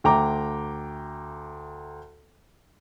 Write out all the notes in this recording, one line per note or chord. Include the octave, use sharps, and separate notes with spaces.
D2 G5 A#5 D6